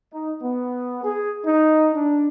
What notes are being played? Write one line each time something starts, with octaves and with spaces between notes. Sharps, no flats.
D#4
B3
G#4
D#4
D4